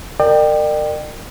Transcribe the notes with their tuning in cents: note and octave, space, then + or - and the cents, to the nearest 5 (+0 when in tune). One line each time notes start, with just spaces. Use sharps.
A#4 -25 D5 +40 G5 +0